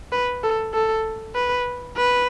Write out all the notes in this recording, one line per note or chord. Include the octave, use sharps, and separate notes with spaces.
B4
A4
A4
B4
B4